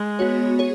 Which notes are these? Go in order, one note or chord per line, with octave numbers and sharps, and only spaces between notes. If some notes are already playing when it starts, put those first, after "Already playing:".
Already playing: G#3
B3 F#4 C#5
G#4 C#5